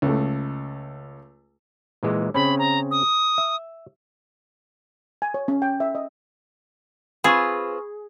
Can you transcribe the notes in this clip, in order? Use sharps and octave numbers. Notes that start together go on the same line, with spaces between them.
C#2 A3
A#2 E3 G#3
C#3 C4 C#4 B5
A#5
D#6
E5
G#5
C#5
C#4
G5
E5
D#5
C4 F4 G#4 B4 B5 C#6